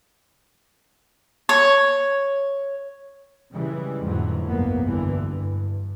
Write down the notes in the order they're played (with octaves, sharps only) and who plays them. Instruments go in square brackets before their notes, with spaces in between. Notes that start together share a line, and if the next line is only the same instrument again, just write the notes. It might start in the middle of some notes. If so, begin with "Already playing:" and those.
[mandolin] C#5
[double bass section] C#3 E3 G3 G#3
F2 A2 D3 E3 F#3
F1 B1 G2 A#3 B3
D2 G2 D3 E3
G2